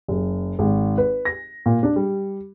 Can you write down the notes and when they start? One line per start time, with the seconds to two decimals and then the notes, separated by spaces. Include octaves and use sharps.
0.08 F#1
0.59 G#1
0.98 B4
1.25 A#6
1.66 A#2
1.83 D4
1.96 G3